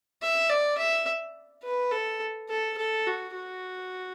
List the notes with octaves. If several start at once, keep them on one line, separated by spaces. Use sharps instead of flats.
E5
D5
E5
B4
A4
A4
A4
F#4
F#4